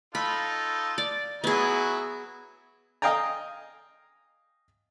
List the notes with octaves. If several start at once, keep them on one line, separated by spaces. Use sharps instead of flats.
D#4 F4 A4 B5
D5
F#3 B3 E4 G#4
D#5 F5 G5 G#5 A#5